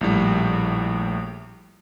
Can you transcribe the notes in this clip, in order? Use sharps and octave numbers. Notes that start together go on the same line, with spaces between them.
A#1 A2 G3